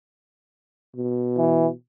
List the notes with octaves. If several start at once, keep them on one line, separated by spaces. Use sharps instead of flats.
B2
E3